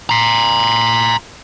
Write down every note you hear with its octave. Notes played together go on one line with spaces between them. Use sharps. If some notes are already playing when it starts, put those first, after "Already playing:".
A#5 C6